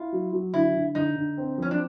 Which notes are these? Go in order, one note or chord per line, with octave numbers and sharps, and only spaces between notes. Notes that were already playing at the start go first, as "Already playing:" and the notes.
Already playing: E4 F4
F#3
F#3
D3 E4
D3
D3 D#4
D3
C4
F3 C#4
D4